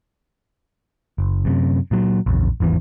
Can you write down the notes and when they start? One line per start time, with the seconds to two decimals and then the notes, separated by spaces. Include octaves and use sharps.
1.18 F#1
1.45 F#2 C3
1.91 A#2 F#3
2.26 A#1 E2
2.60 G#1 E2 D#3 E3